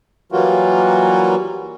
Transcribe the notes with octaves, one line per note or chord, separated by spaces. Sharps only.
E3 F#3 G3 A#3 F4 F#4